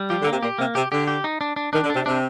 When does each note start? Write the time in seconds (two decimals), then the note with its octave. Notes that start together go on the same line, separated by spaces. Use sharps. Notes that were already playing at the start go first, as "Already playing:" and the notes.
Already playing: G3
0.10 F3 G4
0.21 D3
0.27 C3 A#3
0.42 A#2 G4
0.59 C3 A#3
0.75 C3 G4
0.92 D3 G4
1.07 G4
1.24 D#4
1.41 D4
1.56 D4
1.73 D#3 D4
1.83 D3
1.90 C3 D4
2.06 C3 D4